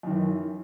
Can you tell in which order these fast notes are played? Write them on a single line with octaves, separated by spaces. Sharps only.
F#2 D#3 E3